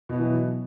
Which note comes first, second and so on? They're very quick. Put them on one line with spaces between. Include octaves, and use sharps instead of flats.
B2 B3 E4 E3 F#3